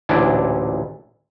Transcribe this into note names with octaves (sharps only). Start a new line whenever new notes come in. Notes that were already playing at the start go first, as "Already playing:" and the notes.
A1 D2 A#2 D4 E4